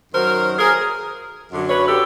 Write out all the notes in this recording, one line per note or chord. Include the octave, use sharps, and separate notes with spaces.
F#2 D#3 F#3 A#4 C5
G#4 A#4
F#2 D3 F#3
B4 C#5
G4 A4